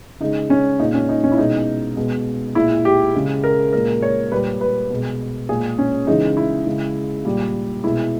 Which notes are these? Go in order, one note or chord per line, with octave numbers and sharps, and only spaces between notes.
C#3 G#3 D#4
C#4
A#2 G#3 D#4
C#4
D#4
C#4
E4
B2 G#3 D#4
B2 G#3
A#2 G#3 E4
G4
C#3 G#3
A#4
A#2 G#3 A#4
C#5
A#2 G3 B4
B4
B2 G#3
A#2 G#3 G#4
C#4
C#3 E3 G#3 D#4
E4
C#3 G#3
A#2 G3
B2 G#3 E4